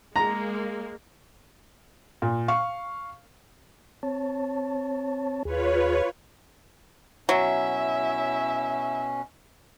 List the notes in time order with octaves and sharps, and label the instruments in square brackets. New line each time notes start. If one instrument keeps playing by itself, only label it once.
[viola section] G#3 A#3 [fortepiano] A#5
[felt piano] A#2
F5 C#6
[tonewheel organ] C4 C#5 A5
[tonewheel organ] D#2 G#4 [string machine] F4 B4 C#5
[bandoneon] B2 C#4 [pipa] F#3 [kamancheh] E4 E5